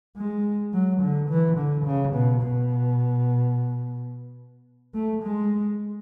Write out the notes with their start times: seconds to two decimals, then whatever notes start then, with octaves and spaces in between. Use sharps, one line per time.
0.17 G#3
0.73 F#3
1.01 D3
1.29 E3
1.57 D3
1.85 C#3
2.14 B2
2.41 B2
4.94 A3
5.23 G#3